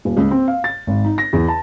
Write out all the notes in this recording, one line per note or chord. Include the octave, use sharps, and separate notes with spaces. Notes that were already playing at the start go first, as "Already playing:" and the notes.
D#1
C#2
C4
F5
A6
G#1
D#4
A#6
E2
A5